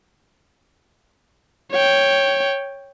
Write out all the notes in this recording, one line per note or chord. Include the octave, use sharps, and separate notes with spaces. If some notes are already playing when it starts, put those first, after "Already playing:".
C#5 G5